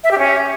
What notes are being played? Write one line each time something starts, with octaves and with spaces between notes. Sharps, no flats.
E5
G4
C#4